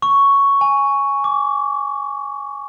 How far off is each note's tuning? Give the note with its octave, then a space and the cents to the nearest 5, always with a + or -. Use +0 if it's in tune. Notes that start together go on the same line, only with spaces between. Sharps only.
C#6 +5
G#5 +0
D6 -25